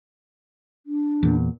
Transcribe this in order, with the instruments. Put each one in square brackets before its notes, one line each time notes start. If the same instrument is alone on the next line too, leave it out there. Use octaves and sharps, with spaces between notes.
[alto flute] D4
[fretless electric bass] E2 A#2